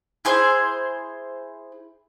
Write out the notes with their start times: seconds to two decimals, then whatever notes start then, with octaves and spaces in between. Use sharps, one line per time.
0.25 E4 G#4 C5